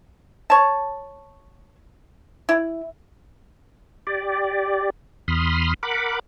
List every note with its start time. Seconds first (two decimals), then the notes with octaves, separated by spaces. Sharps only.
0.50 C#5 A5
2.49 E4
4.07 G4 D5
5.28 E2 B5 C6 D#6 F6
5.83 A#4 F#5 B5 D6